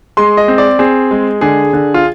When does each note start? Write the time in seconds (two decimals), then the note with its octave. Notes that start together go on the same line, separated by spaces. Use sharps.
0.17 G#3 C6
0.37 D#5
0.48 C4
0.58 D5
0.79 C4 G#4
1.11 G#3
1.41 D3 G#4
1.73 D3
1.94 F4